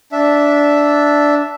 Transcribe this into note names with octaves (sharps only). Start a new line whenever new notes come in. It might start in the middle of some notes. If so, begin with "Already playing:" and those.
D4 E5